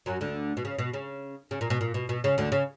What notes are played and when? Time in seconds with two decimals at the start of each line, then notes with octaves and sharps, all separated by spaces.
0.06 F#2 F#3
0.21 D2 D3
0.57 B2
0.65 C#3
0.79 B2
0.93 C#3
1.51 C#3
1.61 A#2
1.70 B2
1.81 A#2
1.94 B2
2.09 B2
2.24 C#3
2.38 D2 D3
2.52 C#3